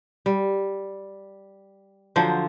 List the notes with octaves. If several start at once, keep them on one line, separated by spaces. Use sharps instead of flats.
G3
D3 F3 F#3 C5